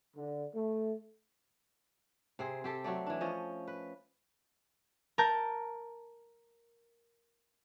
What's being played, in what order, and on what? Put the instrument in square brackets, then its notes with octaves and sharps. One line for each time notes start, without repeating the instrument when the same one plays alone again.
[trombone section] D3
A3
[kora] C3 C4 G#4
C4 G4 A4
F#3 A3 D5
E3 D4
F3 C#4 D#5
B4
[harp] A#4 A5 G6